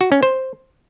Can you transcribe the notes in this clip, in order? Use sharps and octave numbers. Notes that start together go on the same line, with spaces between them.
F#4
C#4
C5